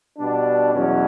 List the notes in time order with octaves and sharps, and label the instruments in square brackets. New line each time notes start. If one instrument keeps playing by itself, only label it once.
[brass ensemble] B2 G3 D4
E2 B2 F#3 C#4